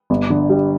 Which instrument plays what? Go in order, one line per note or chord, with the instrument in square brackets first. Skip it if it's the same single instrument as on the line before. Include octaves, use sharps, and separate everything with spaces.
[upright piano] G1
D3
G3